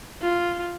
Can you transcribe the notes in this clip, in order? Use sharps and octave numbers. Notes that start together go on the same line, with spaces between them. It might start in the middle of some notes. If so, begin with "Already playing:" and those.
F4